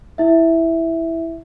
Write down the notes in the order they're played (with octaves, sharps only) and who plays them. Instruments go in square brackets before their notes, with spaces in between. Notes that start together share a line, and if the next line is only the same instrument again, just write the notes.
[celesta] E4 E5